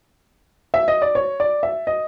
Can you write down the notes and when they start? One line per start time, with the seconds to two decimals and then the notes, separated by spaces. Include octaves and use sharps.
0.74 E5
0.88 D#5
1.02 D5
1.15 C#5
1.40 D5
1.63 E5
1.87 D#5